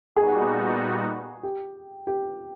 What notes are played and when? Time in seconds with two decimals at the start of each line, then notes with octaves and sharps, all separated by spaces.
0.16 A#2 G3 B3 D#4 F#4 G#4
1.43 G4
2.07 G4